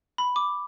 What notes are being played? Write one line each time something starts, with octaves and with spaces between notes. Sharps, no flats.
B5
D6